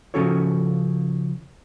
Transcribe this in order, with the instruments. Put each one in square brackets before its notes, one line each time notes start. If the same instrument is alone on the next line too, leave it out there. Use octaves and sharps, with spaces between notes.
[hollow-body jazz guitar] C#3 F3 C#4 F#4 A4 C#5